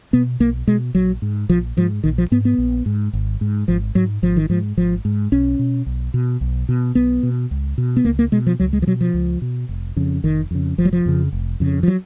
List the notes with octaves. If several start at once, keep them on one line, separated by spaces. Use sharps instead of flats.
B2 B3
B1 A#3
B2 G#3
A#1 F#3
G#2
A#1 F3
G#2 F3
A#1 D#3
F3
G#2 B3
B3
A#1
G#2
G#1
G#2
G#1 F3
G#2 F#3
G#1 F3
D#3
G#2 F3
G#1 F3
G#2
B1 C#4
B2
B1
B2
B1
B2
B1 B3
B2
C#2
B2
B3
C#2 A#3
A#3
B2 G#3
F3
C#2 F#3
G#3
F3
B2 F#3
F3
C#2
B2
F1
F2 C#3
F1 D#3
F2 C#3
F1 F3
F#3
F3
F2 C#3
F1
F2 C#3
F3
F#3